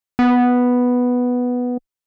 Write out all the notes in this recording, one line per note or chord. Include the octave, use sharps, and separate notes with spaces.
B3